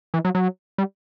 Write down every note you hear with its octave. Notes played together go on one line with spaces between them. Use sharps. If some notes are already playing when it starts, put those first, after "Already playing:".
E3
F#3
F#3
G3